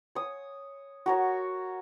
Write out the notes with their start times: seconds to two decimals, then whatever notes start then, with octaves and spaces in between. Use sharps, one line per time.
0.15 C#5 D#6
1.06 F#4 A#4 C#5